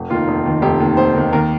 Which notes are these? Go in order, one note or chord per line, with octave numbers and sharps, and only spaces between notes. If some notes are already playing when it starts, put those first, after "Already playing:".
Already playing: F1
D#2 D#3 F4
F1
D#2 D#3
F1 G4
D#2 D#3
F1 C5
D#2 D#3
D#2 A#4